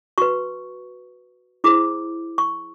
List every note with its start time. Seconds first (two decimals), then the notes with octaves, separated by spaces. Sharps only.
0.18 F#4 B4 C#6
1.64 E4 G#4 C5 D6
2.38 C#6